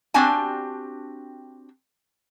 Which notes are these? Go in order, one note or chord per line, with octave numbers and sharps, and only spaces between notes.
C4 D4 F#4 G4 G#5 A5